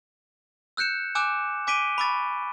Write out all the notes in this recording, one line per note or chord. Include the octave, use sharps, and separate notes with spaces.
E6 F#6 G6 C#7 E7
G#5 D6 E6 F#6 E7
G#5 D6 B6 D7 D#7 G7
B5 C#6 D6 E6 A6